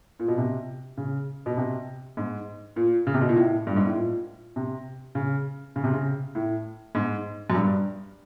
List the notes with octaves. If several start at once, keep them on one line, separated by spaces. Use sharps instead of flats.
A#2
B2
C3
C#3
B2
C3
G#2
A#2
C#3
C3
B2
A#2
A2
G2
G#2
A2
A#2
C3
C#3
C#3
C3
C#3
A2
G#2
F#2
G2